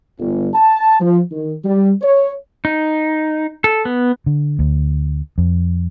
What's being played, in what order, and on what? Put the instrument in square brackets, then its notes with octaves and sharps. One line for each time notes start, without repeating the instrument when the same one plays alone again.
[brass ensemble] G1
A5
F3
D#3
G3
C#5
[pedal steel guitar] D#4
A4
B3
[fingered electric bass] D3
D2
F2